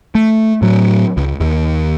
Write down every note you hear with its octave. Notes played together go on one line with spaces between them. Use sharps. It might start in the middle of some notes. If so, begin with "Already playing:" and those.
A3
A2 F#3
C#2
D#2